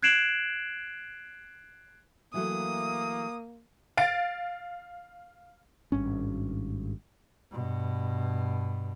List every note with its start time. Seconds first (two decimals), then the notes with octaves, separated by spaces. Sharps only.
0.03 F#6 G#6 C7 D7 E7 F#7
2.34 E3 F#3 A3 A#3 D#6
3.97 F5 A6 D7
5.92 G#1 G2 C#4
7.52 G2 B2